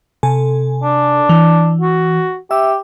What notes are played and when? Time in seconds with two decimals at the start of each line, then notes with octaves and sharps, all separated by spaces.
0.23 C3 A4 G#5
0.83 D4
1.29 E3
1.81 F#4
2.51 G4 E5 E6